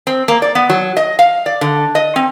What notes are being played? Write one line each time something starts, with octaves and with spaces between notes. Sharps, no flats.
C4
A#3
D5
B3
F#3
D#5
F5
D5
D3
D#5
C4